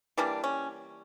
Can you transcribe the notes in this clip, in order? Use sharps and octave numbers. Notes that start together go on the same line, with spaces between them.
E3 G3 A#3 D4
C#4